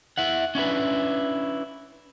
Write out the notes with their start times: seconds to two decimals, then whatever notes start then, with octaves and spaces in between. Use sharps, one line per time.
0.18 E4 E5 F#5
0.55 C#4 D4 E4 B4